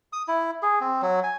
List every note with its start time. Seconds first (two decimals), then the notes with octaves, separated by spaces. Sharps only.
0.13 D#6
0.28 E4
0.63 G#4
0.81 C4
1.02 F#3
1.24 G#5